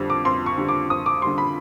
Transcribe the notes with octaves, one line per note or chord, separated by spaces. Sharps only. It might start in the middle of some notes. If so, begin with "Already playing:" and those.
Already playing: F2 D3 G3
D6
F2 C6
C#6
D3 G3
D6
F2 D#6
D6
D3 G3 C6
B5